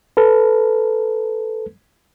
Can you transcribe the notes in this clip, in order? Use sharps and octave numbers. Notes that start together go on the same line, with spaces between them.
A4 B4